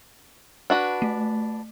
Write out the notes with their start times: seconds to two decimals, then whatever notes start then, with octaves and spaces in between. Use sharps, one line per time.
0.70 D4 F#4 B4
1.02 A3